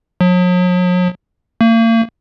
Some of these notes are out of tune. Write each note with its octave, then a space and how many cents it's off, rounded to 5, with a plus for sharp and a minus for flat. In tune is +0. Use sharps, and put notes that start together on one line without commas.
F#3 -45
A#3 -40